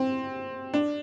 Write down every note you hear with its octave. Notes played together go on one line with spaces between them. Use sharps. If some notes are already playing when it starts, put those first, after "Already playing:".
Already playing: C4
D4